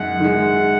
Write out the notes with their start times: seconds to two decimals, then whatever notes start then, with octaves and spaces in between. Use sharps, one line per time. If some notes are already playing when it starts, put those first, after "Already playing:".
Already playing: F#2 D#3 G#3 F#5
0.20 D#3 G#3